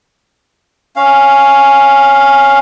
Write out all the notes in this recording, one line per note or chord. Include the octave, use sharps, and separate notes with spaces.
C#4 F5